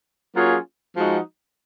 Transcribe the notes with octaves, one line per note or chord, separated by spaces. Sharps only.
F#3 A#3 C#4 F4 G#4
F3 G#3 D#4 F#4